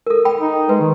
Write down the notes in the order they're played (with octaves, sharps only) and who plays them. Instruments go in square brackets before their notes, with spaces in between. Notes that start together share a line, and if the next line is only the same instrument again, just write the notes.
[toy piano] A4 A#4
G5 B5
[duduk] D#4
[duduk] G#3 [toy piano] B4
[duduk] D#3